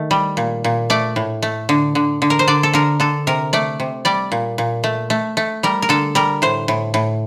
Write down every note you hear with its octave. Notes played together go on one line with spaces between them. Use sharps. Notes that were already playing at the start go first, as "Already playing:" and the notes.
Already playing: D#3 A3
G3
A#2
A#2
A3 D5
A2
A3
D3
D3
D3
A#4
C5
D3 D5
A4
D3 A#4
D3 A4
C3 A#4
A3 D5
C3
G3 D5
A#2
A#2
A3
A3
A3
G3 A#4
A#4
D3 A4
G3 A#4
A2 C5
A2
A2